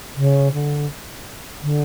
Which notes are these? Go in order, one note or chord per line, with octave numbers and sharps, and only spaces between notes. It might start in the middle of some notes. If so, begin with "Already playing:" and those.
C#3
D3
D3